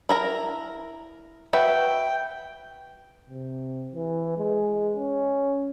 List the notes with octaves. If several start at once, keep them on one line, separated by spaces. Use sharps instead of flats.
E4 A#4 A#5
F#4 B4 E5 G5
C3
E3
G#3
C#4